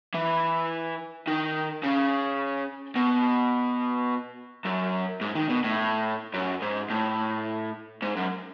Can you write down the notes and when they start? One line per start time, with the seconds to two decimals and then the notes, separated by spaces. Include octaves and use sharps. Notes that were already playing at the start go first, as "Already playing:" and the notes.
0.15 E3
1.27 D#3
1.83 C#3
2.96 B2
4.65 F#2
5.21 G#2
5.35 D#3
5.49 B2
5.64 A2
6.34 F#2
6.62 G#2
6.90 A2
8.03 G#2
8.17 F#2